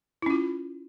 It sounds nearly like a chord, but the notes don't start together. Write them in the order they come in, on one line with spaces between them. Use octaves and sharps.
E4 C#4 F4